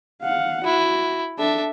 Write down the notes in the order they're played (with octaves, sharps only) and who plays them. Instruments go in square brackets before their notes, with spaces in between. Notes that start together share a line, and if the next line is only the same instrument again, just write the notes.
[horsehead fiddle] F5 F#5
[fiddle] E4 [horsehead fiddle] F#4
[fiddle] D4 E5 [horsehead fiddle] A4